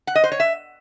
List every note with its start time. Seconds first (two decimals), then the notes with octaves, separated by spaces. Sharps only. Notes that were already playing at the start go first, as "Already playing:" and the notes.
0.07 F#5
0.15 D#5
0.24 C5
0.32 C#5
0.40 E5